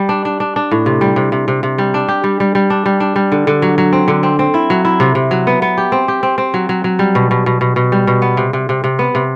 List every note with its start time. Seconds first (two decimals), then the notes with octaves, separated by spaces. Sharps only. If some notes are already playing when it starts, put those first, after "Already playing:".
Already playing: G3
0.09 D4
0.25 D4
0.40 D4
0.56 D4
0.71 A2
0.86 C3
1.01 G3
1.16 C3
1.32 C3
1.48 C3
1.63 C3
1.78 G3
1.94 D4
2.09 G4
2.24 G3
2.40 G3
2.55 G3
2.70 D4
2.86 G3
3.00 D4
3.16 G3
3.32 D3
3.47 D3
3.62 F#3
3.78 F#3
3.93 C4
4.08 D3
4.23 C4
4.39 C4
4.54 E4
4.70 F#3
4.85 E4
5.00 C3
5.15 C3
5.31 F#3
5.47 B3
5.62 B3
5.78 G4
5.92 C4
6.08 G4
6.23 C4
6.38 C4
6.54 F#3
6.69 F#3
6.84 F#3
6.99 G3
7.15 B2
7.31 B2
7.46 B2
7.61 B2
7.76 B2
7.92 G3
8.07 B2
8.22 B3
8.37 C3
8.53 C3
8.69 C3
8.84 C3
8.99 B3
9.15 C3